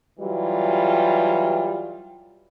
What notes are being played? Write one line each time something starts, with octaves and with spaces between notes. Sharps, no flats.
E3 F#3 G3 F4